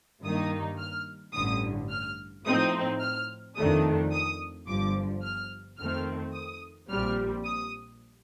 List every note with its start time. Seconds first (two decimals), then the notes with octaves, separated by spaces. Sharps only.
0.23 G2 D#3 A#3 D#4 D#6
0.79 F6
1.34 A1 G2 D3 D#6
1.90 F6
2.45 A2 F3 C4 D#4 D#6
3.01 F6
3.56 F2 D#3 A3 D4 D#6
4.12 D#6
4.67 G1 G2 F3 D6
5.22 F6
5.78 F2 D#3 A3 C4 F6
6.34 D#6
6.90 A#1 A#2 G3 C4 F6
7.45 D#6